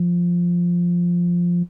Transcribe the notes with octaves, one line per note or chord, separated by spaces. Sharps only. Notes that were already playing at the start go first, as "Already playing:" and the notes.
Already playing: F3